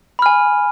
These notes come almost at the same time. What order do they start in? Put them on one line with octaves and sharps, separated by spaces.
B5 F6 G#5